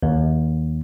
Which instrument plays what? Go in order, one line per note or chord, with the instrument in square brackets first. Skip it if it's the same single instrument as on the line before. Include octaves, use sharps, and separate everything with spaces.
[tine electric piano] D#2